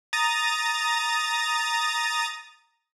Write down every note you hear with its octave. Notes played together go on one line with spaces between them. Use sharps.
A#5 D#6 A6